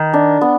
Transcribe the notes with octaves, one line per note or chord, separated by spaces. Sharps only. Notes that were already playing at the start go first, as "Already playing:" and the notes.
Already playing: D#3 B4
D4
B3